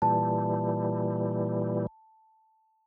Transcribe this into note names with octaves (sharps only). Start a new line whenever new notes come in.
A#2 E3 G3 A5